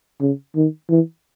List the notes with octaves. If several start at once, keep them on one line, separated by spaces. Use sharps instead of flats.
C#3
D#3
E3